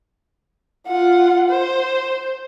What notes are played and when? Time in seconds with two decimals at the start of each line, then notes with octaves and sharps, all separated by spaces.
0.87 F4 F#5
1.50 C5